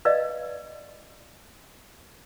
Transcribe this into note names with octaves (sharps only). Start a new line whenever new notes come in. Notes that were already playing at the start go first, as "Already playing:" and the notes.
B4 D5 D#5 F5